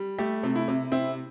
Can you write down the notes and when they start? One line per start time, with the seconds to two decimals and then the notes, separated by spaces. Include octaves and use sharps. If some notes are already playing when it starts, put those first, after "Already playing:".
Already playing: G3
0.18 A3 G4
0.43 C3
0.55 E4
0.68 C3
0.92 C4 E4